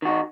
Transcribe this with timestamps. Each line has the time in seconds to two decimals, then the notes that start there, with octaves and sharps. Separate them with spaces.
0.02 D#3
0.05 F#4
0.08 D#4